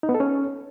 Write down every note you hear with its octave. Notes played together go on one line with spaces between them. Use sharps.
D#4
B3
A4
C#4